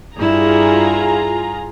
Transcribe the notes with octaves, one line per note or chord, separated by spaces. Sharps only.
G2 E4 F4 G#4 A#5